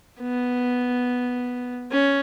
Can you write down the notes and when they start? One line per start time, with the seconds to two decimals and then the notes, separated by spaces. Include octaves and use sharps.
0.20 B3
1.91 C#4